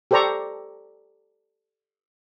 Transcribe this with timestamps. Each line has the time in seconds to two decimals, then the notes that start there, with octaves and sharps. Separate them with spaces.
0.11 G4 A4 C5 D5 A#5 C#6